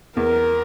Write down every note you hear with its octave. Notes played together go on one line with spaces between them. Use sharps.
E2 A#4